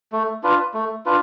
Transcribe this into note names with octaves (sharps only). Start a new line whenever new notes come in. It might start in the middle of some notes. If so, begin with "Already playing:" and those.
A3
D4 F4 B4
A3
D4 F4 B4